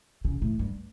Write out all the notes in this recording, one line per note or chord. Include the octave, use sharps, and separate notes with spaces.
C#3
A2
G2